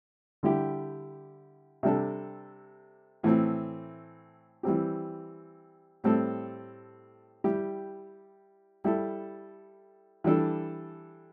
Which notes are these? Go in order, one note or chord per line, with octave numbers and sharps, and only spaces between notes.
D3 G3 E4 G4
C3 G3 D4 A4
A2 E3 A3 C4
E3 G3 C4 G4
A2 G3 C4 A4
G3 E4 G4
G3 E4 A4
E3 G3 D4 A4